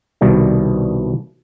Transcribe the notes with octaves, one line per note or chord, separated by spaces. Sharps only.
C2 B2 D#3 G3